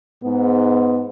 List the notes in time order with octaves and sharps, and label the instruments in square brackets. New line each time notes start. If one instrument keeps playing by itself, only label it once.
[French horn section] G#2 B3